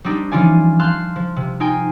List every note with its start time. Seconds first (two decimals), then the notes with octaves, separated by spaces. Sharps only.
0.04 G3 C4 D4 D#4 G4
0.32 E3 F3 C#4 F4 D5 G#5
0.80 F5 A5 C6 F#6 G6
1.16 F3
1.36 C3
1.60 D#4 F4 G5 G#5